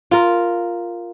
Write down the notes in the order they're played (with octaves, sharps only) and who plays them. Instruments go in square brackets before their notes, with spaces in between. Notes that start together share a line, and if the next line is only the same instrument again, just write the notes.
[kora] F4 A#4